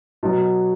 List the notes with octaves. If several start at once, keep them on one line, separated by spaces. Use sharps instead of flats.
B2 F#3